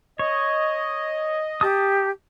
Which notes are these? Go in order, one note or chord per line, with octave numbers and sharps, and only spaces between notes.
C#5 D#5
G4 A5 D#6